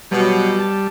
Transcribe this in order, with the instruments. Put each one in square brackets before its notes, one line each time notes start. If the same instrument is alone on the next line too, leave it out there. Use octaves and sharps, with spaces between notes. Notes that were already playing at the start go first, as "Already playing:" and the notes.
[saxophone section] B2 [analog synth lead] F#3 [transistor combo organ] G3
[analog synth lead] A5